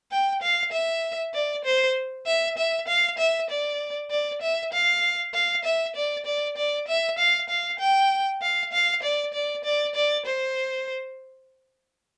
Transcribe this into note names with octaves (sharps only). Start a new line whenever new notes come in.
G5
F5
E5
D5
C5
E5
E5
F5
E5
D5
D5
E5
F5
F5
E5
D5
D5
D5
E5
F5
F5
G5
F5
F5
D5
D5
D5
D5
C5